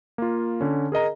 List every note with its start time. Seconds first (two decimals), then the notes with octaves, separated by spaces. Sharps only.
0.18 A#3 F4
0.61 D3 C#4
0.92 G#4 A#4 D#5 A#5